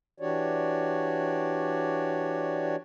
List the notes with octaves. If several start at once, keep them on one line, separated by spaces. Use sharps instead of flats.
E3 D4 F#4 G4 C#5 D5